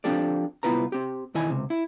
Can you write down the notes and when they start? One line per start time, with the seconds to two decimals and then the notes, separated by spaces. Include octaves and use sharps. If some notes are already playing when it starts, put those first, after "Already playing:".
0.04 F3 C4 D4 G4 A4 D5
0.63 C2 B3 E4 F4 B4 A#5
0.92 C4 G4
1.35 E2 D#3 E4 D#5 G#5
1.50 C#2 C3
1.70 E4